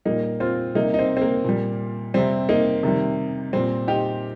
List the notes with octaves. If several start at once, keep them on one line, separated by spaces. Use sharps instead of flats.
A#2 G3 A#3 D#4
C4 F4
C3 G3 A#3 D#4
D#4
C4
C4
A#3
A#2 G3
C3 G3 C4
A#3 D#4
C3 D#3 G3
A#2 G3 C4
D#4 G4